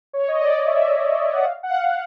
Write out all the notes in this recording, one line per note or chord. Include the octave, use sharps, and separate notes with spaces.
C#5
D#5
D5
E5
F#5
F5
F#5
F5